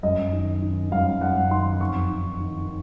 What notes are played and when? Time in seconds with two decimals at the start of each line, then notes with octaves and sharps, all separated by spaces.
0.03 F#2 D#5
0.33 D#3
0.62 D#3
0.92 F#2 F5
1.21 F#2 F#5
1.51 D#3 C6
1.81 F2 C#6
2.10 D#3
2.40 D#3